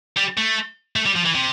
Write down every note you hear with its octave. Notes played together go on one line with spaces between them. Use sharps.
G3
A3
A3
G3
F3
E3
C3